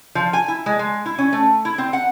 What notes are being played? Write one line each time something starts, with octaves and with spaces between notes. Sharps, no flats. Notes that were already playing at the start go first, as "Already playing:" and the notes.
F3
G#5
E4
G#3
G#3
E4
C#4
A3
E4
C4
F#5